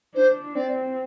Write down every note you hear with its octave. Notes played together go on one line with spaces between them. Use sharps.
D4 C5
C4 D5